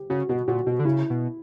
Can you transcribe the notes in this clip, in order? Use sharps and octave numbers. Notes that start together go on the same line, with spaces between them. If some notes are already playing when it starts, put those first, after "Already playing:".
Already playing: G4
C#3 F#4
B2 F#4
A#2 F#4
B2 F#4
D3
C#3 E4
B2